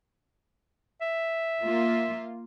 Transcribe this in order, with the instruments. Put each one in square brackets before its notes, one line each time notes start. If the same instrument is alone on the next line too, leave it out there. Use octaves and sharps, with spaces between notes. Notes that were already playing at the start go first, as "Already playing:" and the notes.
[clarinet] E5
[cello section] A#3 F4